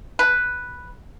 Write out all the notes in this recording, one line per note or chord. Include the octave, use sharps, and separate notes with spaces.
B4